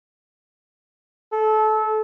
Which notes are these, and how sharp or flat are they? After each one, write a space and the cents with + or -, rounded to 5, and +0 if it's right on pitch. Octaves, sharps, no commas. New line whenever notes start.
A4 -25